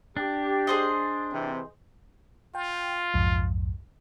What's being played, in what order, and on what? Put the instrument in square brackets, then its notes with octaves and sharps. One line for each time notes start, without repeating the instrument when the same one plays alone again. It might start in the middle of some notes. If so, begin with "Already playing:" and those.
[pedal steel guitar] D4 [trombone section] G4
[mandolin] G#4 C5 D#5
[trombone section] C3 E3 C4
[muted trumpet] F4 [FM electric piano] G5
[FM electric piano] B1 F2 G#2